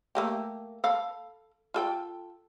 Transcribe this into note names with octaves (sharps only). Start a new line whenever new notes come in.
A3 A#3 G4
A4 F5 B5
F4 A4 G5